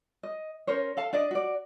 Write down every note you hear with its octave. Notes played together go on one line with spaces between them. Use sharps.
D#5
C#4 A#4 C5 C#5
A4 F5 A5
D4 D5 D#5
F#4 D5